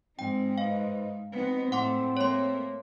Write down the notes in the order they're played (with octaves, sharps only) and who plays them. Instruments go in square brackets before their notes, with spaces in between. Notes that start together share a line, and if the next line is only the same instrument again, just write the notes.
[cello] G#2 D#4 [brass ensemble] C4 [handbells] G5
[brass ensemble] B4 C5 D#5 [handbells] F5
[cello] B3 D#4 [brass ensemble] C4
[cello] A2 A3 [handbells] F#5 C6 D6
[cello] A3 A#3 [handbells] C#5 C6